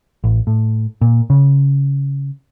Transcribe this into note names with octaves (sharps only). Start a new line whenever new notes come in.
A1
A2
A#2
C#3